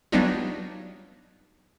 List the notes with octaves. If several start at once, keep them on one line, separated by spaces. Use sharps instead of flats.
F#3 G3 B3 D4 D#4 F4